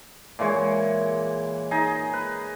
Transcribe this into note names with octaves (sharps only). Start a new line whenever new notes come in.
A#2 E3 G#3 C#5
D#4 G#4 D#5
B4